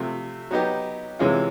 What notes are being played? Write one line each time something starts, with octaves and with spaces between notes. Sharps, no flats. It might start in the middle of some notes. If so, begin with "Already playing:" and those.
Already playing: C3 F3 A3
F#3 B3 D#4 G4
C3 E3 G#3 C#4 F4